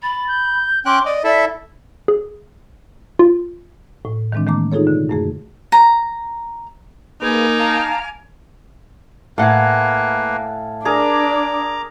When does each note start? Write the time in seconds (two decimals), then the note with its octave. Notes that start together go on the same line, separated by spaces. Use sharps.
0.02 B5 A6
0.28 G6
0.86 C#4 G5 C6 D6 F#6
1.06 D5 D#5
1.24 E4 A4 D5 E5 B6
2.08 G#4
3.19 F4
4.05 A2
4.32 D#3 E3 G#3 C4 D4
4.47 D#3 A3 A#3 D6
4.72 D#4 F4 G#4 A4 C#5
4.87 B2 D3
5.09 F#2 A3 G#4
5.72 A#5
7.22 A#3 D#4 G#4 B4 G#5 D6 F6
7.60 F5 A5 A#5
9.38 A2 A#3 B4 F5 F#5 G#5
10.85 D4 G#4 A#4 D5 A#5 D6